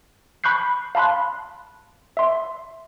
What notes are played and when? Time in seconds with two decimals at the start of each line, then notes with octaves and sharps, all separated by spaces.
0.44 B5 C#6 F#6 G6 C7
0.95 F5 A5 B5 C6 F#6
2.17 E5 C6